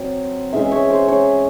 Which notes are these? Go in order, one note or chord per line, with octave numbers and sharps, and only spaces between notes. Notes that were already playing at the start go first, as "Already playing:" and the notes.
Already playing: F#3 C4
E3 G#3 C#4 E5
C#5
C5
C#5